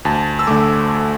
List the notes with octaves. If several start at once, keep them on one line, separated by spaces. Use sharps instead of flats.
D2 A5
E6
D3 A3 D6